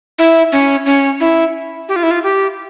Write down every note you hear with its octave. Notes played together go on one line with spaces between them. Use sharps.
E4
C#4
C#4
E4
G4
F4
E4
F4
G4